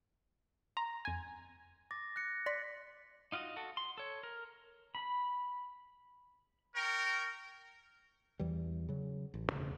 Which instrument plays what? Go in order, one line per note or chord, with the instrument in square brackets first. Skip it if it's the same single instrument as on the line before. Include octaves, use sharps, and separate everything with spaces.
[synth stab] A#5 [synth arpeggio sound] C6
[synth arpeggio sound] F2 G#6 [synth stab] G#5
[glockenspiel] D6 A6 A#6
F#6 A#6 C#7
[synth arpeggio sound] D5 C6 [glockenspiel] B6
[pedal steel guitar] D#4 F4 F#4 D#5
F#4 A4
C6
A4 C#5
A#4
B5
[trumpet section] A#4 C#5 G5
[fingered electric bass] E2 E3 G3
C#3 F#3
A1
E1 D2 C#3